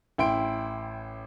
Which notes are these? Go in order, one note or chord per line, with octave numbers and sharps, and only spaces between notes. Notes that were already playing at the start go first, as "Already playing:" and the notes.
A1 E4 G5 C6 D7